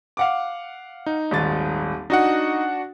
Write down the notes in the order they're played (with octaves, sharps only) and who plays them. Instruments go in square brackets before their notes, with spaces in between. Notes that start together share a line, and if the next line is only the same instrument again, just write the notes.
[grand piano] F5 F#5 D6
[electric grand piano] D#4
[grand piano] D#1 G#1 A6
[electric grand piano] D4 F#4 F#5 [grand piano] D#4